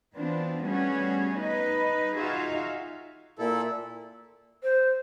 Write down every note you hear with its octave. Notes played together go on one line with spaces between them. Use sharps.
E3 B3 C4 D4 F4
G3 A3 B3 C#4 F#4 G#4
D#4 B4 D#5
D#4 F4 F#4 G#4 E5 F5
A#2 E4 A4
C5